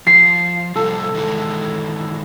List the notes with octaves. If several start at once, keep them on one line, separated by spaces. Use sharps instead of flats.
F3 C7
C3 F3 G3 A4
D#3 E3 G#3